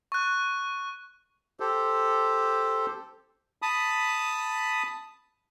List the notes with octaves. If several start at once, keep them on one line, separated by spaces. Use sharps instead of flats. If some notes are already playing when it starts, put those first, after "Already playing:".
C#6 F#6
G4 A4 C5
A5 B5 D#6